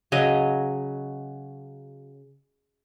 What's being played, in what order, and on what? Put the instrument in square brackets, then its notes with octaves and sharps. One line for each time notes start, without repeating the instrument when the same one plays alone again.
[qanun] C#3 F#3 D#5